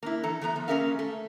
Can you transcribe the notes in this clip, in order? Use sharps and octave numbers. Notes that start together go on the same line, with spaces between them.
A#3 D4 E4
E3 A4 A#5
E3 A3 B3 A#5
F3
A#3 C#4 G#4 A#4 E5 F5
A3